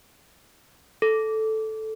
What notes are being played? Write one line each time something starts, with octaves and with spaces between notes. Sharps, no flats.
A4